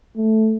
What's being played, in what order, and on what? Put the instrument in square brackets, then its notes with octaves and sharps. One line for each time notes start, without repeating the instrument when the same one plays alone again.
[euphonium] A3